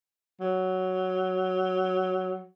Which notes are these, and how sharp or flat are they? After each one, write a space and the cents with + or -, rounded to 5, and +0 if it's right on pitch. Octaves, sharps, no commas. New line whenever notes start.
F#3 +5